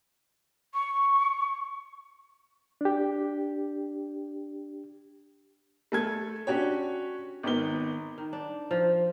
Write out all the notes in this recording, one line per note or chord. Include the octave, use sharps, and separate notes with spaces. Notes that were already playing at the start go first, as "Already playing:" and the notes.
C#6
D4 G4
A3 A4 G#6
C#4 D4 F#4 G4 C#5
G#1 D#3 B3 G7
D#3
D4
F3